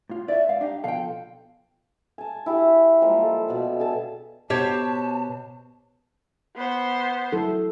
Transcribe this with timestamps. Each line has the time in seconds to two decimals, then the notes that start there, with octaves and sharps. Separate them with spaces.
0.09 A2 F4
0.28 E4 B4 C#5 D5 E5
0.49 G#2 F5
0.61 D4 D#4 G4 F5
0.84 B2 F3 A4 F5 G5
2.18 G#5 A5
2.46 E4 G4 G#4
3.02 F3 G3 G#3 A#3
3.22 A4
3.48 B2 D5
3.80 G#4 A4 A5
4.50 B2 B3 G4 C5 C#5 A5
6.56 B3 C5
7.33 F#3 E4 A4